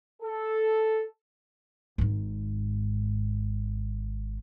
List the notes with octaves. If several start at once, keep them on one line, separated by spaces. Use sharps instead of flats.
A4
G#1 G#2